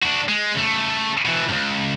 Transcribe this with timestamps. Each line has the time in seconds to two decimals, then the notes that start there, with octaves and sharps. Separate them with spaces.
0.02 D4 F#4
0.28 G#3
0.54 C#3 A3
1.25 B2 E3
1.48 C#2 G2